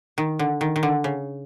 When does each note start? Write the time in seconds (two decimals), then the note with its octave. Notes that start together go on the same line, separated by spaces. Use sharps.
0.18 D#3
0.39 D3
0.61 D#3
0.76 D#3
0.83 D3
1.04 C#3